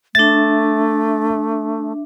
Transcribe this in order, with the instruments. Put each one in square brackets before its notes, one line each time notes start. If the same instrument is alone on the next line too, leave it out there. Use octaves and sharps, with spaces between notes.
[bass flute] A3 [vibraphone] D4 E5 [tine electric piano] A6